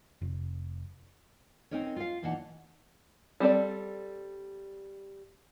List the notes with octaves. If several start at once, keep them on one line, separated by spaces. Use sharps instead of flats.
F1
C4 C#4 D#4 A#4 C#5
F4 F5
E2 A#2 E3 D#4 F#5 A5
G3 C4 A4 D5